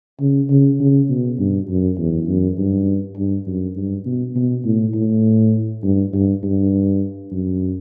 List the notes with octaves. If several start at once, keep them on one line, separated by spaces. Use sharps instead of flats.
C#3
C#3
C#3
B2
G2
F#2
E2
F#2
G2
G2
F#2
G2
B2
B2
A2
A2
G2
G2
G2
F#2